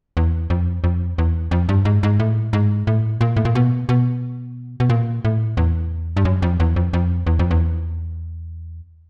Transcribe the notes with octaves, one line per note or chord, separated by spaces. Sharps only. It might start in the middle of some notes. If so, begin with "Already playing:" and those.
E2
F2
F2
E2
F2
G2
G#2
G#2
A2
G#2
A2
A#2
A2
A#2
B2
B2
B2
A#2
A2
E2
G2
F#2
F2
E2
F2
F2
E2
F2
E2